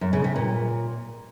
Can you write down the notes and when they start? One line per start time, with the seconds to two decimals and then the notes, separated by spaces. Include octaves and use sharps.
0.01 F#2
0.13 C#3
0.24 C3
0.36 A#2